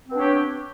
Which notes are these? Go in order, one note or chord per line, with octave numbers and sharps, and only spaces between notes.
B3 C4 D4 G4 C#5